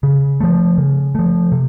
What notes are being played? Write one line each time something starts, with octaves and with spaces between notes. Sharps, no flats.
C#3
F3 A3
C#3
F3 A3
C3